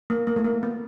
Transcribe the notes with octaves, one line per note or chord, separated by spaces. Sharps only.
A#3
A#3
A3
A#3
B3